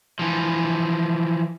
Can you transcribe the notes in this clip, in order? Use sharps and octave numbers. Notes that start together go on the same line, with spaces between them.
E3 F3